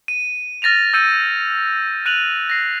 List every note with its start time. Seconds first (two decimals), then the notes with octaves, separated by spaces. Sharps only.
0.08 D#7
0.62 F6 A6 A#6 D#7 F7
0.93 E6 G6 C#7 D#7
2.06 F#6 D#7 F7 F#7
2.50 A#6 C7